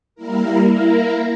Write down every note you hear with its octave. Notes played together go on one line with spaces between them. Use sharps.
G3 A#3 E4 A#4
A#3 E4 A#4